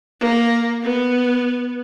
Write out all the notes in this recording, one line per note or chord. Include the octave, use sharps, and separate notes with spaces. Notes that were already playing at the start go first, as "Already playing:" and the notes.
A#3
B3